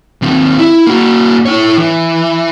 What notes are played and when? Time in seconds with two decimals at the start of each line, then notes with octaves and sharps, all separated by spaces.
0.22 D#2 C4
0.58 E4
0.87 A#3 F#4
1.46 E4 C#5
1.77 E3